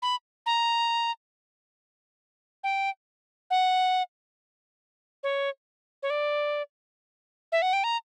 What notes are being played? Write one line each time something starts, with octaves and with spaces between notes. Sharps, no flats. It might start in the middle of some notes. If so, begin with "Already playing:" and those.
B5
A#5
G5
F#5
C#5
C#5
D5
E5
F#5
G5
A#5